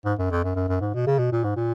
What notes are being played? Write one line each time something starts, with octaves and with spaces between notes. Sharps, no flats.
G#2
F#2
F2
F#2
F#2
F#2
G#2
B2
C#3
B2
A#2
G#2
A#2